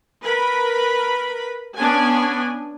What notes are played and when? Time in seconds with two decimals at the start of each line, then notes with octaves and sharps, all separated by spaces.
0.23 A#4 B4 B5
1.77 B3 C#4 D4 G#5